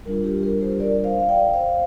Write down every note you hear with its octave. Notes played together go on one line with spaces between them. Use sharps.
G3 D4 F4 A#4
G4
A#4
G4 C5
A#4 D5
C5 F5
F5
D5 G5
C5 F5